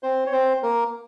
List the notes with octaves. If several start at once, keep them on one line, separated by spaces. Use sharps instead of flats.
C4 C5
C#5
C4 C5
A#3 A#4